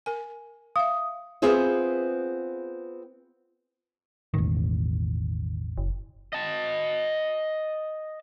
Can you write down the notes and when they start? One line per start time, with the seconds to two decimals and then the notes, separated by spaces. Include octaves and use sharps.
0.06 A#4 G#5
0.76 E5 F5 D#6
1.42 B3 C4 F4 G#4 C5 E5
4.34 E1 A1 D#3
5.78 F#1
6.33 D#5 A5